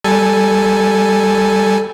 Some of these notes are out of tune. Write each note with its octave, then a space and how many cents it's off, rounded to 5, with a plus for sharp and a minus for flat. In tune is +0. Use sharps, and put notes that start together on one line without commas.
G3 +0 A4 +0 G#5 +0